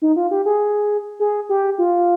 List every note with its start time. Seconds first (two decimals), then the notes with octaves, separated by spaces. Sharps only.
0.02 D#4
0.16 F4
0.31 G4
0.46 G#4
1.20 G#4
1.49 G4
1.78 F4